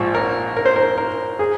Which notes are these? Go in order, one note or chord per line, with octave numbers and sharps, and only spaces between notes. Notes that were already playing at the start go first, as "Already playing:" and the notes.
Already playing: A#1 G#2 F3
A#4
A#4
C5
A#4
A#4
G#4